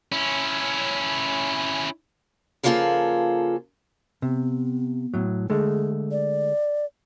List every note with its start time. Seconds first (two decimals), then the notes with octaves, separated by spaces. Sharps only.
0.12 C#4 E4
2.63 C#3 F3 A#3 F4 G#4 A4
4.22 C3 B3
5.14 A2 F#3
5.50 D3 G#3 A3 G#4
6.11 D5